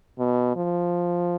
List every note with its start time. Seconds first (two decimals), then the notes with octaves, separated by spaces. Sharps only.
0.19 B2
0.56 F3